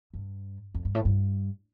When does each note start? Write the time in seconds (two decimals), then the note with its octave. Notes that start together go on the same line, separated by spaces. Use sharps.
0.14 G2
0.75 F2
0.85 G2
0.95 A2
1.05 G2